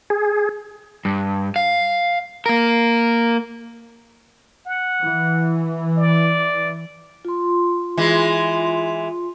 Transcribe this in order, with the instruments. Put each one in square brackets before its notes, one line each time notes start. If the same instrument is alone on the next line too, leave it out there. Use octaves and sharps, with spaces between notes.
[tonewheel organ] G#4
[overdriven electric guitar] G2
F5
A#3 A#4
[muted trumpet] F#5
[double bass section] E3
[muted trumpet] D5
[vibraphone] F4 C6
[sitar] E3 G#3